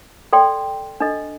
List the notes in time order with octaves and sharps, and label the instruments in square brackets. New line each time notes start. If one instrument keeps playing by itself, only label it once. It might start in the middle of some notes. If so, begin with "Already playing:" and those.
[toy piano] A4 D5 G5 C6
D4 A4 D#5